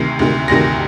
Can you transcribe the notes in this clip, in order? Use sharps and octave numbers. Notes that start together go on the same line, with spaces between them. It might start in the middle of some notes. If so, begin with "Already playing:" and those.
Already playing: D2 C3 D#3 C7
D2 C3 D#3
D2 C3 D#3 A#6